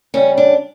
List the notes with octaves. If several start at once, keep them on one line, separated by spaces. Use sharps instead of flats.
C#3 G3 C#4
D4